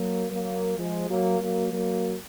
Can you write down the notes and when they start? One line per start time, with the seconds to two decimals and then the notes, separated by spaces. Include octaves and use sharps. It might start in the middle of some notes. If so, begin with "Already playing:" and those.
Already playing: F#3 A#3
0.31 F#3 A#3
0.78 F3 G#3
1.09 F#3 A#3
1.41 F#3 A#3
1.72 F#3 A#3